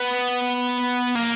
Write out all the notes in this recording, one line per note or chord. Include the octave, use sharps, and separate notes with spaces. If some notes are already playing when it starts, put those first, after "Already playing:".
Already playing: B3
A#3